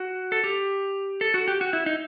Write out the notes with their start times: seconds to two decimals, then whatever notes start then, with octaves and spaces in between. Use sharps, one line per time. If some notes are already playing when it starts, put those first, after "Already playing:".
Already playing: F#4
0.32 A4
0.44 G4
1.21 A4
1.34 F#4
1.48 G4
1.61 F#4
1.73 E4
1.86 D#4